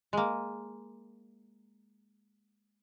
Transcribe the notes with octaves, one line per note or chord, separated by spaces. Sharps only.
G#3 A#3